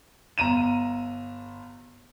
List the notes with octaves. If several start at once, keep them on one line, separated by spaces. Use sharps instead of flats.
G1 A#5 D#7 E7